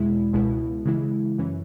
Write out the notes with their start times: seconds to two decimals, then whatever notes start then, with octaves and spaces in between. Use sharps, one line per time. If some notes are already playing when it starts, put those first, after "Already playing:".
Already playing: E2 B2 G#3 E4
0.33 C#2 B2 G#3 E4
0.85 C#3 E3 G#3 E4
1.38 F#2 E3 C#4